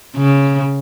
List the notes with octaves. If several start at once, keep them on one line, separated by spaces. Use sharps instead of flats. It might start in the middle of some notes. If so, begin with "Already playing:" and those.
C#3